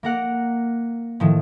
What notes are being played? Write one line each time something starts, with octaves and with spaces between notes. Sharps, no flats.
A#3 A#4 F#5
A2 D#3 F3